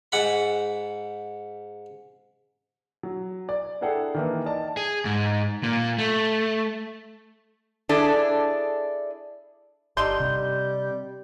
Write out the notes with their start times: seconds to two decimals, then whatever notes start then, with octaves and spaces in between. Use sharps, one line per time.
0.12 G#2 F#5 B5
3.03 F#3
3.49 D5
3.81 D4 E4 G#4 A4 F#5 G5
4.14 D#3 E3 A#3
4.46 D5 D#5 A5
4.77 G#4
5.05 G#2
5.63 A#2
5.98 A3
7.89 D4 E4 G#4 A4
9.97 G1 D3 G3 D#4 C6 G6
10.20 C3